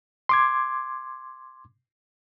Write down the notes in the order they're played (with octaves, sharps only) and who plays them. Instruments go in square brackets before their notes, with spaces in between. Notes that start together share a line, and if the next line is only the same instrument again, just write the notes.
[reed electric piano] C6 D6 G#6